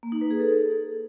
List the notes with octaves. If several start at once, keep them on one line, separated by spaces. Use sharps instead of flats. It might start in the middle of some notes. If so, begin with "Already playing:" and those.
A#3
D#4
B4
G#4
A4